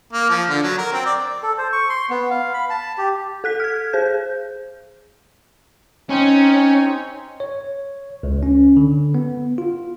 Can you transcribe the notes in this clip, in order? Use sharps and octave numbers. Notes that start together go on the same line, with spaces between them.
A#3
F3
D3
F#3
A#4
C4
D5
A4
C5
C#6
C6
B3
F5
B5
A5
G4
A4 F#6 B6
F6 G#6
G#4 C5 G6
C4 C#4 D#4 G#5
C#5
C#2
C#4
D3
B3
F4